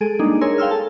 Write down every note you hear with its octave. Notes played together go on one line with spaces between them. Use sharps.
G#3 G#4 A4 D7 D#7
G3 G#3 A#3 D4 D#4 G#4
G#4 A#4 C#5 G#5 C6 E6
F5 G5 C6 E6 F6
A4 A5